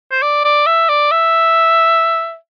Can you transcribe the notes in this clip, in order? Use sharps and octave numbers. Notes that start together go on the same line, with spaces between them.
C5
D5
D5
E5
D5
E5